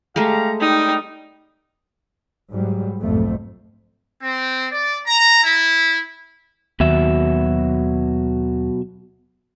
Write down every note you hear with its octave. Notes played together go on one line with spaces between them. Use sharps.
G#3 A3 G4 F5 A#5
G3 D#4 G5 D#6
G#2 F#3 G3
B1 F2 G#2 F3 A3
C4
D5
A#5
E4
D#2 B2 F#3 E5